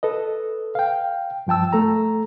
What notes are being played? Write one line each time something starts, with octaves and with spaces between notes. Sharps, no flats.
A4 B4 D#5
F5 G5
G2 F3 G5 A5 E6
A3 A4 A#5